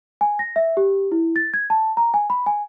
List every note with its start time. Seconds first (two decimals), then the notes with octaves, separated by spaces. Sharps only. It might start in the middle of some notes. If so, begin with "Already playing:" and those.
0.21 G#5
0.39 A#6
0.56 E5
0.77 G4
1.12 E4
1.36 A6
1.54 G#6
1.70 A5
1.97 A#5
2.14 G#5
2.30 B5
2.46 G#5